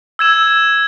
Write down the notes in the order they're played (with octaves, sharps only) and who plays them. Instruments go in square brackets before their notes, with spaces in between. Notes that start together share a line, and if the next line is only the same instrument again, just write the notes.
[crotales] E6 G#6 E7